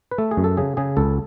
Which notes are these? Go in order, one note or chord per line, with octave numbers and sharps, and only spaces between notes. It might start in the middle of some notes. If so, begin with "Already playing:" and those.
B4
A3 A4
G#4
F#2
A4
C#3 G#4
C#3 G#4
C#2 A4